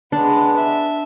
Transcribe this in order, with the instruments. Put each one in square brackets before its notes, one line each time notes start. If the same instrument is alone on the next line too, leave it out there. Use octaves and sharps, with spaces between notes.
[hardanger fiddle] G#3 B3 [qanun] D4
[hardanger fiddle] E5